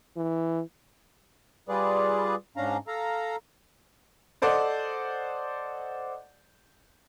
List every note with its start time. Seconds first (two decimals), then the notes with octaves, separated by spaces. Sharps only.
0.17 E3
1.69 G3 F4 G#4 B4 D5
2.57 G#2 C#4 D4 F5 A#5
2.87 A4 F5 A#5
4.42 A4 C5 D5 D#5 F#5